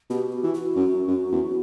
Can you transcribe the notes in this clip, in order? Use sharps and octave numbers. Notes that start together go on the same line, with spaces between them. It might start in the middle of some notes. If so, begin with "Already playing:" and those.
B2 G4
F#4
E3
F#4
F#2
F#2
E2